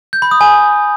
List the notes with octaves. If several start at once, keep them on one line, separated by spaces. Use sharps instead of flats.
G6
B5
D#6
G#5